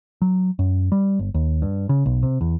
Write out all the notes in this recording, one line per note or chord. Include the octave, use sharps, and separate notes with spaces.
F#3
F#2
G3
G1
D#2
G2
C#3
B1
C3
E2